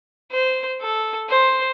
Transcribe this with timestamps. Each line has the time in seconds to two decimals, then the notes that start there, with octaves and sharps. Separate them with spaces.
0.32 C5
0.81 A4
1.30 C5